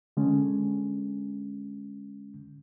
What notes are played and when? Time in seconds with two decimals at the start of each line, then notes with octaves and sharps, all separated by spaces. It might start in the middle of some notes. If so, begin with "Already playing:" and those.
0.17 D3 G#3 C#4